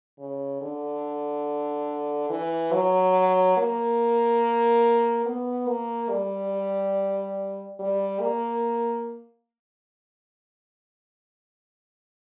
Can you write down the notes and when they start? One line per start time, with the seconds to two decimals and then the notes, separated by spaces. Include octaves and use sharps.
0.19 C#3
0.61 D3
2.30 E3
2.72 F#3
3.57 A#3
5.26 B3
5.68 A#3
6.09 G3
7.79 G3
8.20 A#3